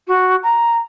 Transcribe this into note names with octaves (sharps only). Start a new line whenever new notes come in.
F#4
A#5